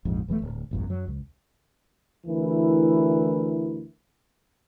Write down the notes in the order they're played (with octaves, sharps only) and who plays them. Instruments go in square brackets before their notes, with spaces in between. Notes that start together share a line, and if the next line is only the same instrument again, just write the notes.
[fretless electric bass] A#1 F2 G#2
E1 E3 F#3 A3
D1
E1 A1 F#2
F#2 F#3
C#2
[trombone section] D2 E3 E4 A#4